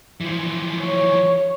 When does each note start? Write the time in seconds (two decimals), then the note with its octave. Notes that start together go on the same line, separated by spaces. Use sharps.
0.21 E3 F3
0.81 C#5